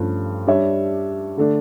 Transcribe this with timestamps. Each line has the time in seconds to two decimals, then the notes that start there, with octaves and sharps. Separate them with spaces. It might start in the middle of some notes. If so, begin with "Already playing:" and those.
Already playing: G2 F3 A3 C#4 F4
0.47 G3 D4 G4 C#5 E5
1.37 D3 A3 D4